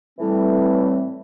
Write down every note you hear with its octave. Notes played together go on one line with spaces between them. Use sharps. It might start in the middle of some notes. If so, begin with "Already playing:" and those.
A2 E3 G3 C4